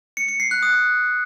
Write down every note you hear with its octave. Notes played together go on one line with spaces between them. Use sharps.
C#7
C#7
C7
F#6
D#6